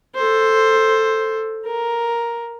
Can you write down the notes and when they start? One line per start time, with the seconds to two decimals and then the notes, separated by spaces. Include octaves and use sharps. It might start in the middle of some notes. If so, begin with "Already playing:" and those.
0.15 A4 C5
1.65 A#4